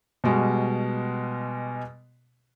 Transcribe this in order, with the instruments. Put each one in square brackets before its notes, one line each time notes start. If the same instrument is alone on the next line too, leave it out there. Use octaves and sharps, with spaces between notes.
[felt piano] B2 G3 G#3 F#4